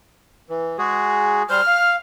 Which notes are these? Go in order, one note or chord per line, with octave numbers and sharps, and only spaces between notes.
E3
G#3 F#4 G#4
G3 C5 F6 G6
F5